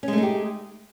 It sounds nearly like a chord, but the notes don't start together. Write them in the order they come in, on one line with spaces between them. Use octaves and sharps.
C#4 G#3 A3 D#4 G4